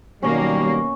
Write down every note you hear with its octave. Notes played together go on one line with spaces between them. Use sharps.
B2 D#3 F#3 G3 A#3 C#4 C#5